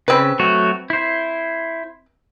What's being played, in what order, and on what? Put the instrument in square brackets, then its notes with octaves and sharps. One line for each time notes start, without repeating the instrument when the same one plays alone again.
[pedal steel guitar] C#3 [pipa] C4 B4
[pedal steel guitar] F#3 A3 F#4
E4 C5